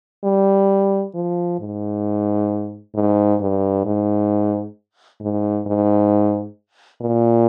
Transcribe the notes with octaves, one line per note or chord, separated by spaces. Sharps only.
G3
F3
G#2
G#2
G2
G#2
G#2
G#2
A#2